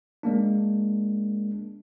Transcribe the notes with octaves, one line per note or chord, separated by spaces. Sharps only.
G#3 A#3 D4